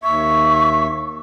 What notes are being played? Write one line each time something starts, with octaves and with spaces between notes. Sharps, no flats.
D#2 E5 C#6